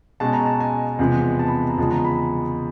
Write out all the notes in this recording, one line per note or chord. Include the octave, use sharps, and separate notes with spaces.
B2 G#3 C#4 A5
A#5
A5
G#5
E2 C3 F3 G#3 B3
A5
B5
A#5
E2 C#3 F3 G#3 A5
A#5
B5